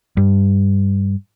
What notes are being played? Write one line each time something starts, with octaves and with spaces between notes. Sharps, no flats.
G2